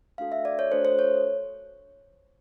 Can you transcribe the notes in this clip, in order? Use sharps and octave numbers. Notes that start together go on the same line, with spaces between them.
A3 D4 F#4 A4 F5
E5
D5
C#5
A3 D4 F#4 A4 C5
C5
C#5